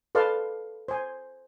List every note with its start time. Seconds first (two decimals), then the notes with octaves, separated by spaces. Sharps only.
0.15 A4 B4 D5 F5 A5 C6
0.88 C5 G#5